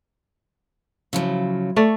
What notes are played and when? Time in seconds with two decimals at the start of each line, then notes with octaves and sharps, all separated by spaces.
1.13 C#3 F3 F#3 E4
1.76 A3 C#5 D5